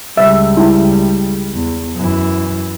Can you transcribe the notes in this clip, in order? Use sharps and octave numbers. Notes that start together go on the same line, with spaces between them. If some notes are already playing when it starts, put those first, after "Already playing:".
C#2 G3 E5
E4
E2
F#2 E3